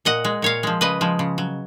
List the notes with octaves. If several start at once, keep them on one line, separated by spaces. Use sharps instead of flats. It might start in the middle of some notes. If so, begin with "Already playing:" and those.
A#2 D#5 F#5
G#3
A#2 C#5 F5
F3 G#3
C#3 B4 D#5
F3 G#3
C#3
F#3